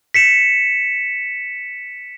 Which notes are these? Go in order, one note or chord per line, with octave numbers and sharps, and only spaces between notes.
B6 C#7 E7